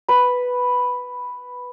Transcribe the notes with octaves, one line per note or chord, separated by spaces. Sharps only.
B4 B5